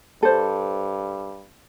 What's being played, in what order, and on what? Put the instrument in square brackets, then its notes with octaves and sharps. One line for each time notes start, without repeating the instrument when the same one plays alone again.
[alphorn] G2 [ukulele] A4 C5